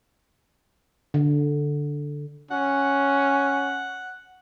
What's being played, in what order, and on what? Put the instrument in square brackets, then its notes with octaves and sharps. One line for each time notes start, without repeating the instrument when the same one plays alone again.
[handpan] D3
[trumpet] C#4 [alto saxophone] F#5